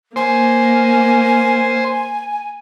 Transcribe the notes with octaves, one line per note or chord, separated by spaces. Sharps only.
A#3 C5 G#5